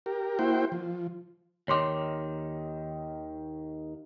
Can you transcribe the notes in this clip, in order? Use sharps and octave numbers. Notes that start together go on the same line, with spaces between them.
G4 A#4
A#3 E4 F#4 C5 G5
F3
D#2 D#3 C#5 C6 D6